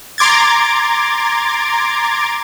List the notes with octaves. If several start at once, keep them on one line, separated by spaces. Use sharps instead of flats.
A#5 C6 D6 G#6 A6